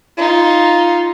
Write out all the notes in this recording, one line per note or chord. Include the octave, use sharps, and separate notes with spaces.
D#4 F4